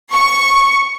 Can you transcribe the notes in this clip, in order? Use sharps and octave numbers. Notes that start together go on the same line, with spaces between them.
C#6